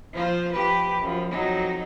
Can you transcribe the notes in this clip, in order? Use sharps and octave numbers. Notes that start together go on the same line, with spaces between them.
F3 F4 C5
F3 G4 B4
F#2 F3
F2 F#3 D#4